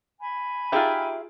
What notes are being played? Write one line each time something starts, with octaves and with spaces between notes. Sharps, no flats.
G#5 B5
D#4 F4 G4 G#4 E5